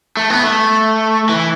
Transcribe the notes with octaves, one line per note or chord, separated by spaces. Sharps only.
A3
B3
A3
E3